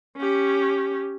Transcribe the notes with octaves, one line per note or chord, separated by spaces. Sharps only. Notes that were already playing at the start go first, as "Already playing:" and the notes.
C#4 G4